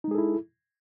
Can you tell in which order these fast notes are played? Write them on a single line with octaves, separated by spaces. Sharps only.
D#4 G#3 G#4 A4 E4